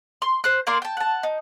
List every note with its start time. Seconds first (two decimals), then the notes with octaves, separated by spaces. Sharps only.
0.22 C6
0.44 C5 F#6
0.67 A#3 A#4 D5 C6
0.82 G5 A5
0.97 F#5 A5
1.23 D#4